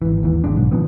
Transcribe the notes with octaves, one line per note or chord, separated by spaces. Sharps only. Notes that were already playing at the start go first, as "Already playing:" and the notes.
G#1 E3
D#2 E3
G#1 C#3 G#3 D4
B1 G#2
D#3 F3 B3 C4